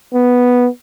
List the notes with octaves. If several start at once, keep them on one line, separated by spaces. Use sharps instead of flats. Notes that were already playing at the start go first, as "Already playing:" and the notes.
B3